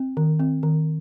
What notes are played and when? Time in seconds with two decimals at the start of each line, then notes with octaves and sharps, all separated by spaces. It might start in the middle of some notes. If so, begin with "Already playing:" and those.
Already playing: C4
0.17 D#3
0.40 C4
0.63 D#3